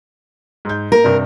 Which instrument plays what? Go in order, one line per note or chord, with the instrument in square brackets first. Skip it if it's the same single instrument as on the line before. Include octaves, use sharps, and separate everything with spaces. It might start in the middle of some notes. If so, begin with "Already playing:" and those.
[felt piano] G#2 G6
[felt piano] A#3 [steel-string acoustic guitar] A#4
[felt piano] G2 C3 D4